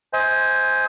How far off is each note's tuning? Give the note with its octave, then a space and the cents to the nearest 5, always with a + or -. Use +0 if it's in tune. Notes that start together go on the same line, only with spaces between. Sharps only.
C5 +0 D#5 +40 G#5 +0